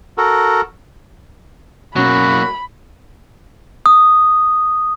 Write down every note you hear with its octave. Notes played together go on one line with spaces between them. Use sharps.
F#4 A4 A#4
B2 F#3 A#3 C#4 F#4 B5
D#6